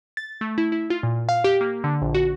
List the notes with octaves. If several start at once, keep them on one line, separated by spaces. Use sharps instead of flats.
A6
A3
E4
E4
F4
A#2
F5
G4
A#3
D3
A#1
F#4